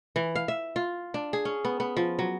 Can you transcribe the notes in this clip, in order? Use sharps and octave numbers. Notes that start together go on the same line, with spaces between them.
E3
F5
E5
F4
D4
G#4
C#4
B3
B3
F3
F#3